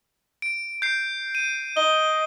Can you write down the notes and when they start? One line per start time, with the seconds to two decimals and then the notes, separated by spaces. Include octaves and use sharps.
0.42 D7
0.82 G6 C7
1.35 D#7
1.77 D#5 G7